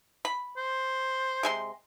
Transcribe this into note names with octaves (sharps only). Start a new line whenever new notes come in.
B5
C5
C3 G#3 C6